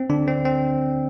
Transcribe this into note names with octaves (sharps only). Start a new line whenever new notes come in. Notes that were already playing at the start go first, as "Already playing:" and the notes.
Already playing: C4
D3 D4
C4
C4